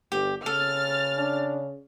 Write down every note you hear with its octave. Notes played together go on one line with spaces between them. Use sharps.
G1 G4
C#3 A4 F6 A6
D4